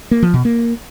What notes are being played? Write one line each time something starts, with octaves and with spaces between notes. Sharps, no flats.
A#3
F3
B2
A#3